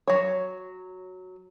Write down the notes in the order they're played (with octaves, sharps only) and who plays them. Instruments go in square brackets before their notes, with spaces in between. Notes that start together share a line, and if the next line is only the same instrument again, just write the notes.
[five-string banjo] F#3 C#5